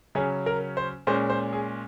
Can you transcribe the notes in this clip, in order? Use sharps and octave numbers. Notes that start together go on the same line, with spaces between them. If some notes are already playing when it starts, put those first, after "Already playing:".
C#3 F#3 C#4 G#4
A#4
C5
A#2 G#3 C#4 C5
C5
G#4